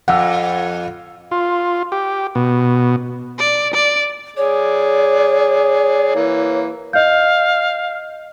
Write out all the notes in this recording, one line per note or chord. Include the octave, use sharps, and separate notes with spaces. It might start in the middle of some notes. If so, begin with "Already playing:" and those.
F2 F#5 E6
F4
G4
B2
D5
D5
G#4 C#5 D5
E3 A#3
D#5 F5 G6